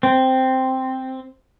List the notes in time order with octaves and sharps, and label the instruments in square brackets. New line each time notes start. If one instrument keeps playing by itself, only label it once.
[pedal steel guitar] C4